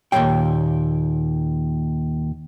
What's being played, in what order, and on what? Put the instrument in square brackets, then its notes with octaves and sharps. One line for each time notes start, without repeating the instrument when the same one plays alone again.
[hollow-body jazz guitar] D#2 A#2 F3 G#3 C#5 G5